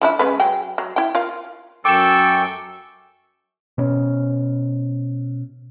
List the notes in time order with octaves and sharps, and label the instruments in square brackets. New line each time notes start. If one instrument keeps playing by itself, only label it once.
[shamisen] F3 D4 E4
C#3 G#3 B4
F#3 G#4 G5
F#3
E4 G5
F4 A#4 F5
[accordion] F#2 E6 [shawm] A4 [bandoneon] G5 C#6 [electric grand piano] D6 E7
[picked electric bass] B2 C#4